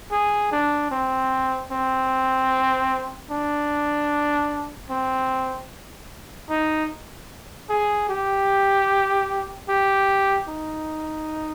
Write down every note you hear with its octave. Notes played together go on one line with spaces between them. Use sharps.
G#4
D4
C4
C4
D4
C4
D#4
G#4
G4
G4
D#4